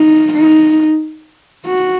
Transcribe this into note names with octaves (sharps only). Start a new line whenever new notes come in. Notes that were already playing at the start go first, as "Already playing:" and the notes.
Already playing: D#4
D#4
F#4